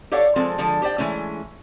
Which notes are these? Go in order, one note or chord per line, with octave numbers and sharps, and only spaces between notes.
G4 A4 C#5 D5 F5 F#5
F3 G#3 C4 A4
D3 F3 G#3 A4
G4 C5 D5 G5
E3 G#3 A3 C#4